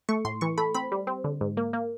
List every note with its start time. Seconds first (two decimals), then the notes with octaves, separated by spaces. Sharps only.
0.09 A3 C#6
0.25 A2 C6
0.41 E3 C#6
0.58 A3 B5
0.74 C4 B5
0.92 G3
1.07 C4
1.24 D3
1.41 G#2
1.57 A#3
1.73 A#3